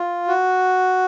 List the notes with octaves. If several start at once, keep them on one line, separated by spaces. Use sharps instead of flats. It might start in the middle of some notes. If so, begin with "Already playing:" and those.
Already playing: F4
F#4